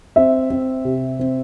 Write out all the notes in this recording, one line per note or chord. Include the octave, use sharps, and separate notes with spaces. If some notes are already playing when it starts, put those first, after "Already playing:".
C4 E5
C4
C3
C4